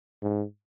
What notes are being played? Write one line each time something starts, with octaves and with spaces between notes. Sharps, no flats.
G#2